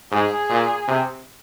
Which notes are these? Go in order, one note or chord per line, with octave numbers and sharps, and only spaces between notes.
G#2 G#4
A#2
C3